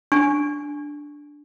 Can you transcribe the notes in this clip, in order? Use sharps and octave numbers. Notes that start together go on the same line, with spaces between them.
D4 G#5 C#6